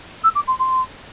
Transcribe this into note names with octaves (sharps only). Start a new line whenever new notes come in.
E6
D6
C6
C6